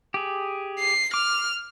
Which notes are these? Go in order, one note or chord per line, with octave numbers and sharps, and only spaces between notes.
G4 G#4
C7
D6 F6